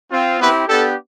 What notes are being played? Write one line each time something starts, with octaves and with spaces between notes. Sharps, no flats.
C4 F4
B3 C4 E4 G4 B4
B3 D4 G4 A4